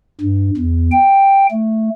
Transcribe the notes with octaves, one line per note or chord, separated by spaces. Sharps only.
G2
E2
G5
A3